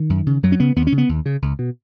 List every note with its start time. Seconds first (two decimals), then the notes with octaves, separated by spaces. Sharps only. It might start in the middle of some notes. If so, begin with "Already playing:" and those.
Already playing: D#3
0.10 F#2
0.27 C#3
0.43 F#2 F#3
0.52 C#4
0.60 C#3 B3
0.76 D#2 B3
0.87 C#4
0.92 C#3
0.98 B3
1.09 D#2
1.26 C#3
1.42 C#2
1.59 B2